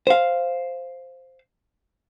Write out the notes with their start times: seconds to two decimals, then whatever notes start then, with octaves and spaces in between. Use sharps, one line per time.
0.07 C5 F5